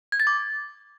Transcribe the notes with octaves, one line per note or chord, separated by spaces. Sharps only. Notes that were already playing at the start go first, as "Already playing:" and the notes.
G#6
A6
D6